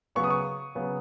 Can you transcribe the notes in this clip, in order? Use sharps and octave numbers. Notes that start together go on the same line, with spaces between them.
C#3 F#3 B3 C#6
D#6
C#6
C#3 F#3 B3